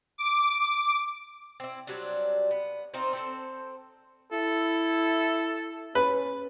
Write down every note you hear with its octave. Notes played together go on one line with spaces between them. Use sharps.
D6
C4 E4
F#3 G3 C4 D4
B3
C4 D#4 F4 C5
C4 A4 C5
E4 A4
C#4 B4